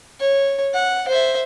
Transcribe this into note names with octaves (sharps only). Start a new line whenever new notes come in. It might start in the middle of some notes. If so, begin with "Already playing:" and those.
C#5
F#5
C5 E5